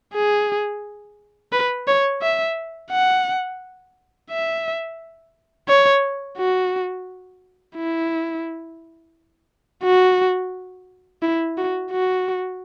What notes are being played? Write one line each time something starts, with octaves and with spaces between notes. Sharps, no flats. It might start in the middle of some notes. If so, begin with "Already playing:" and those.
G#4
B4
C#5
E5
F#5
E5
C#5
F#4
E4
F#4
E4
F#4
F#4